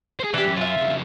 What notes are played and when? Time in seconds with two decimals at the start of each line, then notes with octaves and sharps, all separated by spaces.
0.20 G#4 C5
0.34 E3 D4 G4
0.45 F#2
0.57 F4 E5
0.77 F2 C#3